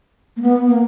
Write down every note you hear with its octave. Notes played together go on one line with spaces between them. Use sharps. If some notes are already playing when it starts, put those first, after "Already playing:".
A#3
B3
A#3